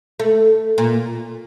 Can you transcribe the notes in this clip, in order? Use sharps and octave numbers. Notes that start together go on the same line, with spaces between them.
A3
A#2